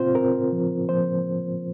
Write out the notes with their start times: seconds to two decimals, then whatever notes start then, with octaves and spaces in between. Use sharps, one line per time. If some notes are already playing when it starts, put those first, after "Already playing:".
Already playing: A#2 C4 F4 C5
0.15 C4 A#4
0.52 F3
0.89 F3 C5